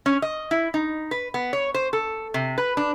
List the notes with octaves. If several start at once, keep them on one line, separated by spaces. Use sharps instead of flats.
C#4
D#5
E4
D#4
B4
B3
C#5
C5
A4
C3
B4
D4